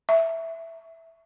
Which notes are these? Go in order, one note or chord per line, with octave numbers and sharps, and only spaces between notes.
E5